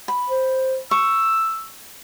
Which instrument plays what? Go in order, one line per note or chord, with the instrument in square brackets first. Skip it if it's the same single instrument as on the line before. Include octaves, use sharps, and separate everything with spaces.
[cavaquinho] B5
[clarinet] C5
[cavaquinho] C#6 [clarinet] E6